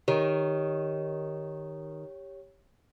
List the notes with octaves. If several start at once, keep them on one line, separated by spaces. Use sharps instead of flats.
D#3 G4 C#5